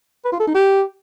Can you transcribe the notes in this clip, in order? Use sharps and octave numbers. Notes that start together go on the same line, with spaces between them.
B4
F4
A4
D#4
G4